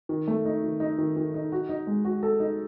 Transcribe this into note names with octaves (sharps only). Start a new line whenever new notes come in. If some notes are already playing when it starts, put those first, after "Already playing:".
D#3
A3
D#4
D#3
D#4
D#3
D#3
D#4
F#4
D#4
G#3
F#4
A4
D#4